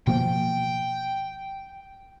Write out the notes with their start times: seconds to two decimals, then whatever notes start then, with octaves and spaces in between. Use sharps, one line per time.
0.07 B2 F3 A#3 G5